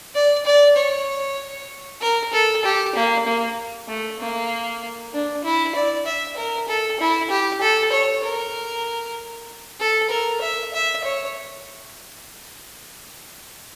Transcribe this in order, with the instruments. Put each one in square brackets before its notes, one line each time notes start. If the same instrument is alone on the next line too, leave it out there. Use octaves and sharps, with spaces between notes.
[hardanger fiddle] D5
D5
C#5
A#4
A4
G4
A#3
A#3
A3
A#3
D4
E4
D5
E5
A#4
A4
E4
G4
A4
C#5
A#4
A4
A#4
E5
E5
C#5